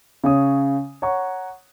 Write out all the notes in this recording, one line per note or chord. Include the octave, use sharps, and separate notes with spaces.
C#3 C#5 D#6
C#5 F#5 A#5 C#6